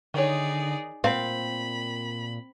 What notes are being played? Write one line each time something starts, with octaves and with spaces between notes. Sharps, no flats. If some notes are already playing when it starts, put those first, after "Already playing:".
D3 D#3 D#4 G#4 C#5 D5
A#2 C4 F5 B5